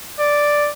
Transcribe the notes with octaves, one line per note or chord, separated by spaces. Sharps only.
D5